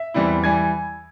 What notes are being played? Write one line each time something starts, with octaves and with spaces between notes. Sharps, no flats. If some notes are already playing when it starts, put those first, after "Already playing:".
Already playing: E5
E2 E3 G3 C4 E4
E3 G3 G#5 G#6